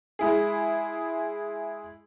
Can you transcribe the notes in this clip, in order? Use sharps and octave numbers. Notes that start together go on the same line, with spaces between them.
G#3 E4 G#4